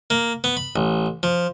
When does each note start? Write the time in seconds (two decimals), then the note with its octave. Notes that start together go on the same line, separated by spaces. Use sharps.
0.10 A#3
0.44 B3
0.57 B5
0.76 A1
1.23 F3